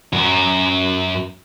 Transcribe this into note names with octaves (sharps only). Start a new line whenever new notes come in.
F#2 F#4